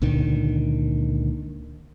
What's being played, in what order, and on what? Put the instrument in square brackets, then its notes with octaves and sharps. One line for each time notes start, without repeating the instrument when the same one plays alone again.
[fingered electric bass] C#2 A#2 D3 D#3